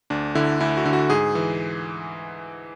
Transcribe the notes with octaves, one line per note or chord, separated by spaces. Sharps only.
D2 D4
D3 E4
D2 E4
F#4
D3
F#4
G#2 G#4
E3